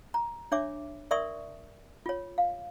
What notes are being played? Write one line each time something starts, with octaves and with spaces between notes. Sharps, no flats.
A#5
D4 C#5 E5 D6
A#4 D5 E5 C6 C#6 D#6
F4 C#5
F5